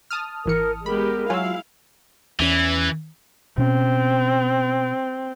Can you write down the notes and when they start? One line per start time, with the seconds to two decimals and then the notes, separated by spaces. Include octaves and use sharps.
0.11 A5 D#6 F6
0.46 G#1 E3 A#4 C#7
0.86 G#3 B3 G4 A#4 B5
1.30 F#3 E4 F4 F5 G#5 E6
2.40 E2 E3 C#4
3.58 B2 C4 C#4